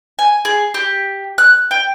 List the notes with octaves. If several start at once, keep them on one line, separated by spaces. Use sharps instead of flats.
G#5
G#4
G4
F#6
G5